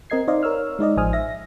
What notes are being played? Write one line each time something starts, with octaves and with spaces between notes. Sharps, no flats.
C4 A#4 D#5 G#6 C7
D#4 C5 D5 D#5 F5
A#4 C#5 E6 F6
G#3 D#4 D5 D#5
A1 F3 C5 G#5 D#6 F6
E5 A#6